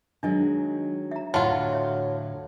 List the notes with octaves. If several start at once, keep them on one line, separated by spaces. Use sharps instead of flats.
D#3 F#3 G#3 D4 D#5
E5 A#5
D2 A2 D3 F#3 F4 C5 A5
C#5 E5